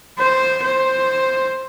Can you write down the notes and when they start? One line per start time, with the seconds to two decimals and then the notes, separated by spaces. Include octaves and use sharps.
0.18 C5
0.63 C5